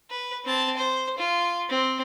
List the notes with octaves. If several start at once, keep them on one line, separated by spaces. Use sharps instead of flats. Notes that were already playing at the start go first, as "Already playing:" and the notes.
B4
C4 A5
C5
F4
C4